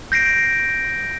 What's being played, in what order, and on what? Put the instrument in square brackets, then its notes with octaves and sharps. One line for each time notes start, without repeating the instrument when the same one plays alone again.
[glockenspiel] G6 A#6 C7 D7